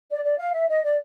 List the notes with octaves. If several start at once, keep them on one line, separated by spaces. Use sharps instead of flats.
D5
D5
F5
E5
D#5
D5